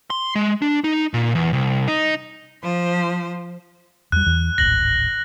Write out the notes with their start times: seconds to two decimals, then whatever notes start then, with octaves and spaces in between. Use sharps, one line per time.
0.10 C6
0.35 G#3
0.62 D4
0.84 D#4
1.14 A#2
1.35 E2
1.53 C2
1.88 D#4
2.62 F3 C5
4.12 E2 G3 F#6
4.26 E2 E3
4.58 D1 G#1 A#6 F#7